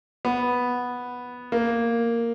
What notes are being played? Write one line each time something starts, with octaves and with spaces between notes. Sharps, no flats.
B3
A#3